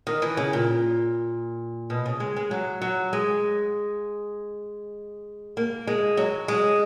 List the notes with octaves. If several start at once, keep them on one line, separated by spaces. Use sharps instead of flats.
D#3
E3
C#3
A#2
B2
C#3
G#3
G#3
F#3
F#3
G#3
A#3
G#3
F#3
G#3